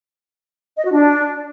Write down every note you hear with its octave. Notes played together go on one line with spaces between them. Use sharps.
D#5
F#4
D4